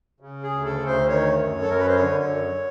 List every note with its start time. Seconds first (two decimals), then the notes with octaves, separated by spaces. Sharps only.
0.20 C#3
0.43 G#4
0.50 D2
0.64 A4
0.79 D2
0.86 C5
1.08 D#3 C#5
1.37 F#2
1.61 A4
1.66 F#2 A#4
1.79 B4
1.87 C5
1.95 D3 C#5
2.24 F#2